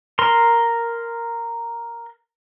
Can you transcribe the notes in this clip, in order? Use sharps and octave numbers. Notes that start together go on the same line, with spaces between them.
A#4 C6